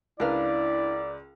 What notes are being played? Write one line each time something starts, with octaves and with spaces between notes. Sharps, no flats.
C#2 D4 E4 A#4 B4 D5 F5